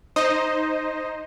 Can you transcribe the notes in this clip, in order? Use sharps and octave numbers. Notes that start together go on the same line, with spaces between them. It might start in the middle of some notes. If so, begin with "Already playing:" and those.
D#4 C5 D#5